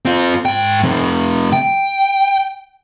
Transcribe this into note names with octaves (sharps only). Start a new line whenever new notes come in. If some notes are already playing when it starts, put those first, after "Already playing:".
C4 F4
G#2 G5
F2 C3
G5